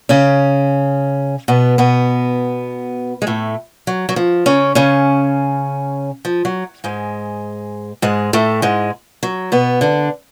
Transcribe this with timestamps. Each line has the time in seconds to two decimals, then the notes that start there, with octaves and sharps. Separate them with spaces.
0.09 C#3 C#4
1.48 B2 B3
1.78 B2 B3
3.22 G#3
3.27 A2 A3
3.87 F#3
4.09 F#3
4.16 F3
4.46 C#3 C#4
4.75 C#3 C#4
6.25 F3
6.45 F#3
6.84 G#2 G#3
8.02 G#2 G#3
8.33 A2 A3
8.62 G#2 G#3
9.23 F#3
9.52 B2 B3
9.81 D3 D4